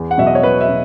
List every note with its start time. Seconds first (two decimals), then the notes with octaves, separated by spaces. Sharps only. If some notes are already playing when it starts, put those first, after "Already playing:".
Already playing: E2
0.11 F#5
0.18 B2 F#3 E5
0.27 D#5
0.35 C#5
0.43 E2 B4
0.61 E5
0.69 B2